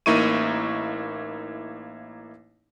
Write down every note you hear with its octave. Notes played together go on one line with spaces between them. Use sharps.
A1 A#3 D#4 E4 C#6 D#7